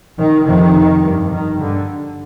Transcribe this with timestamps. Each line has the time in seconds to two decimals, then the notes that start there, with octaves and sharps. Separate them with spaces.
0.18 D#3
0.47 F2 C3 D#3
1.02 G2
1.31 D#3
1.59 G2 D3